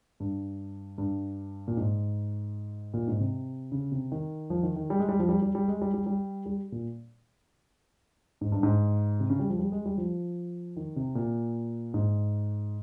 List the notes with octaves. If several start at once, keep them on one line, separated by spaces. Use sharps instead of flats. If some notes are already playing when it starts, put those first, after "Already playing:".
G2
G2
A#2
G#2
A#2
G#2
C3
C#3
C3
D#3
F3
D#3
D#3
G3
G#3
G3
F3
G3
G3
G3
G#3
G3
G3
G3
G3
A#2
G#2
G2
G#2
C3
C#3
G3
F3
G3
G#3
G3
F3
D#3
C3
A#2
G#2